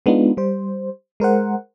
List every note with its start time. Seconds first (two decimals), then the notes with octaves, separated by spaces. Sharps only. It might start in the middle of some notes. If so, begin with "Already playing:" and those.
0.06 G#3 B3 D4 D#4 F4
0.37 G3 C5
1.20 G#3 A#4 C5 F#5